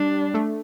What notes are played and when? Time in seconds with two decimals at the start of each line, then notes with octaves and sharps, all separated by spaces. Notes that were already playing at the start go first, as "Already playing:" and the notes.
Already playing: G3 D4
0.34 A3